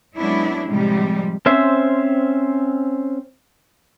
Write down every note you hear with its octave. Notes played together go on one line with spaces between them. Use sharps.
F#3 G#3 B3 C#4 D4 E4
A2 C3 F3 G3 G#3
C4 C#4 C5 E5